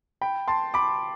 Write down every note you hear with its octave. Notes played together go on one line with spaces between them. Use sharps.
G5 B5
A5 C6
B5 D6